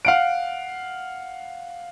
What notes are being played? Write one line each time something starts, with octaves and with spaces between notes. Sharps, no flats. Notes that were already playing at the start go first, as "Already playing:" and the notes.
F5 F#5 D7